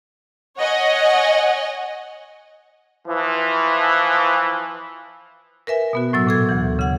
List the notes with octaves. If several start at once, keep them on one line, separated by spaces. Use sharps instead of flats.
C#5 D#5 F#5 G#5
E3 F3
A#4 B4 E5 G#5
B2 B3 F#4
A2 F#3 E6
A#2 A4 G#6
D2 E3
C#3 F#5